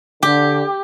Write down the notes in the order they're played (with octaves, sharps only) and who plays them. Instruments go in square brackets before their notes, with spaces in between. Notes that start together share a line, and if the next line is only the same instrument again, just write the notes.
[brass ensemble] D3 [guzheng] G4